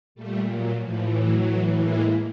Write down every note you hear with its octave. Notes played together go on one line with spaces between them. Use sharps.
A#2 G3 A3
F#3
A2 E3 F3
F#3
A2 E3
G#3 A#3